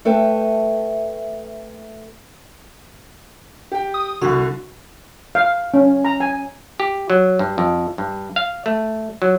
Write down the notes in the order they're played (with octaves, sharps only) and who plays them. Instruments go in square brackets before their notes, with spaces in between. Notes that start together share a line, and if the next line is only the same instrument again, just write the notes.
[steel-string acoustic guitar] A3 A4 B4 E5 G5
[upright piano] G4 G5
[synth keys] D#6
[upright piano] C2 D3 [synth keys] F#4
[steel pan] F5
C#4
A#5
G#5
[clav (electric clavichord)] G4
F#3
G2
F2
G2
F5
A3
F#3